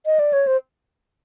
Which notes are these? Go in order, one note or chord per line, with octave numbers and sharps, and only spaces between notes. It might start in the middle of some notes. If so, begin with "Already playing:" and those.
D#5
D5
C#5
C5